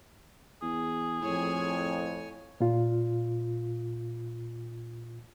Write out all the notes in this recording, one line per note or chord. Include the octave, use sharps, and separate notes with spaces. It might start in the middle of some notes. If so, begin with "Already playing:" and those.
E2 G#4
F2 A2 C#5 G#5
A#2 F4